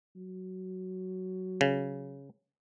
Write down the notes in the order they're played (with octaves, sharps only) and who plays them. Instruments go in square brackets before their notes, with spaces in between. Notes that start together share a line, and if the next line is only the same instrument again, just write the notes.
[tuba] F#3
[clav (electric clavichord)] C#3